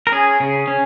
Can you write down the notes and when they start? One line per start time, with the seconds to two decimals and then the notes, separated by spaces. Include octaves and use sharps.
0.07 A#4
0.12 C#4 G#4
0.40 C#3
0.68 C#4